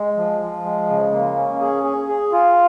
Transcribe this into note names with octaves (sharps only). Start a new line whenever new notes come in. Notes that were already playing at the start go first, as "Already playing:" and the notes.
Already playing: G#3
F3
F3
G#3
C#3
A#3
C#4
G#4
G#4
G#4
F4